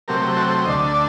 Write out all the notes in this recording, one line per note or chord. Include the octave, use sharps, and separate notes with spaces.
C3 F#3 A3 C4 G4 A#4
F#4 A4
D2 D3 A3 D4 C5 D#5
D5